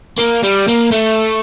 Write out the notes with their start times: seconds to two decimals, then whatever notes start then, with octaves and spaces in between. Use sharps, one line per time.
0.19 A#3
0.44 G3
0.68 A#3
0.92 A3